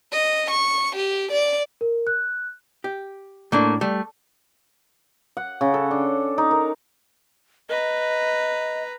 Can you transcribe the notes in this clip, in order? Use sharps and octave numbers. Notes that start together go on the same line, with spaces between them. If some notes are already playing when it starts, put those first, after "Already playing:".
D#5
C#6
G4
D5
A#4
F#6
G4
A2 A3 A#3 D4
G3 A3
F#5
C#3
A4
D4
D#4
A#4
B4 D#5 A#5